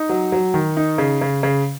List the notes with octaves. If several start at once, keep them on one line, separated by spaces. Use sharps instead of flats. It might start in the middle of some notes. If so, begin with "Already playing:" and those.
Already playing: D#4
F#3
F#3
D#3
D#4
C#3
C#3
C#3